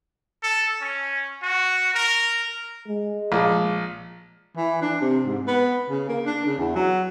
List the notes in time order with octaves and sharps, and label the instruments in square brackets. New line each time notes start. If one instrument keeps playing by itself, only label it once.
[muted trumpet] A4
C#4
F#4
A#4
[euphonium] G#3
[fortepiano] A#1
[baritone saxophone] E3
D4
C3
G#2
B3
C#3
A#3
D4
C#3
E2
F#3